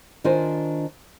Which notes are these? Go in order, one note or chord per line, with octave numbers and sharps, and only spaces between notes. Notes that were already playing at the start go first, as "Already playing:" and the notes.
D#3 D4 F4 C5 G#5